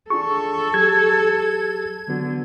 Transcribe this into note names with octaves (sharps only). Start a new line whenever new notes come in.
D4 F4 G#4 A4 C#6
F#3 G4 G#4 G#6
D3 F#3 B3 F#4